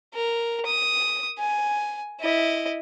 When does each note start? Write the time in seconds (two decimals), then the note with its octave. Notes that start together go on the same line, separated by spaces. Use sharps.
0.14 A#4
0.66 D#6
1.38 G#5
2.21 E4 D#5